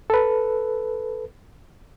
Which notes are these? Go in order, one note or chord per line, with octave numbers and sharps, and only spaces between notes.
A4 B4